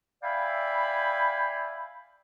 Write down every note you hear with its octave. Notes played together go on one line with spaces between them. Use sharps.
D5 E5 F5 G5 G#5 B5